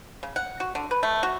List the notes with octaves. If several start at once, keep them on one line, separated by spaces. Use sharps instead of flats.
C#3
F#5
F#4
D3
B4
A3
F#4